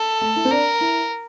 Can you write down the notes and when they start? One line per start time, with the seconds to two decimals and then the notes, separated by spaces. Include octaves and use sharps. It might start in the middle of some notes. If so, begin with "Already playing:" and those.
Already playing: A4
0.21 A3
0.36 E4
0.45 C4
0.50 D4 A#4
0.81 E4